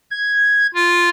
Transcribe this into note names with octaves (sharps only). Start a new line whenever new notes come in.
G#6
F4